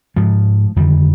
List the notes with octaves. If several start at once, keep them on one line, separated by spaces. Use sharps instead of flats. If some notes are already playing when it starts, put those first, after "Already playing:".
G#2 F3 G#3
F2 D3 D#3 G3